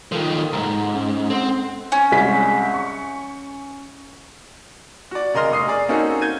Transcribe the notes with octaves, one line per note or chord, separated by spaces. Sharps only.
D#3 F3 F4 A4 A#4
C2 G#2 A#5
C#4
C4 A4 F#5 C6
C#4
C2 G#3 B6
C#6
F#4 D5
C#3 A#4 D#5 C6 F6 A#6
F1 C#6 D#6 C7
G#4 D5
A#3 C4 C#4 D#4 F#4 A4
G6 G#6 D#7